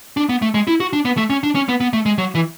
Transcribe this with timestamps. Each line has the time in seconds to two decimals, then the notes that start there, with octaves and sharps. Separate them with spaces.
0.17 D4
0.29 B3
0.42 A3
0.54 G#3
0.67 E4
0.80 F#4
0.93 D4
1.05 B3
1.17 A3
1.30 C#4
1.43 D4
1.55 C#4
1.69 B3
1.80 B3
1.93 A3
2.06 G#3
2.18 F#3
2.35 E3